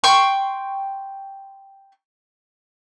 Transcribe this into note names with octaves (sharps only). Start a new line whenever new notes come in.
G5 C6 C#6